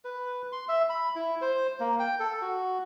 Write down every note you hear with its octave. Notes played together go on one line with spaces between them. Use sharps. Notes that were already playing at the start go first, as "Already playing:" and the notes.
B4
C6
E5
B5
E4
C5
A#3
G5
A4
F#4